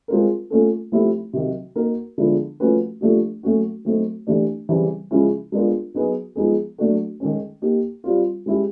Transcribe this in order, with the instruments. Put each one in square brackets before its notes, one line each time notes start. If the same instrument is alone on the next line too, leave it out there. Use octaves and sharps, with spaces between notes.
[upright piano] G#3 C4 F4 A#4
A3 C#4 F4 A4
F3 A3 C4 E4 G4
C3 D#3 F#3
A#3 D#4 F#4 A#4
D3 F3 G#3 B3 E4
F3 A3 C#4 F#4 B4
F3 A3 D4 G4
F#3 A3 C#4 F#4
F#3 A3 C4 D#4
E3 A3 D4 G4
C#3 E3 G3 C4
C#3 F3 G#3 C#4 E4
G#3 B3 D4 F4 A#4
F#3 B3 D#4 G#4 B4
F3 G#3 B3 D#4 G#4
F#3 A3 D4 F#4 A4
D#3 G#3 C#4
A#3 D#4 G4
G3 C4 F4
G#3 C#4 E4 G4